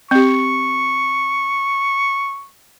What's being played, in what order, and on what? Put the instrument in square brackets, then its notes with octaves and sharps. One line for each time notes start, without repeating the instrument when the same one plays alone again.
[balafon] C4 G4 [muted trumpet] C#6